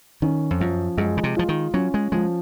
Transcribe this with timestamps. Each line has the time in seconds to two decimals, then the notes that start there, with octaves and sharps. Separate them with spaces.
0.22 D#3 C#4
0.51 F2
0.60 F#2 F3
0.98 F#2 G#3
1.17 C#3
1.24 C3
1.37 F3 F4
1.49 D#3
1.74 F#3 C#4
1.94 G#3
2.12 F3 G#3